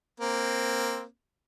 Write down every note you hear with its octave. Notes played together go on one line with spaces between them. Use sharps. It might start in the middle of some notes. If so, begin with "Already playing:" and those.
A#3 C4